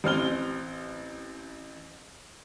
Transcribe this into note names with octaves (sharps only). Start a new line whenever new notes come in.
A1 C4 F6 G7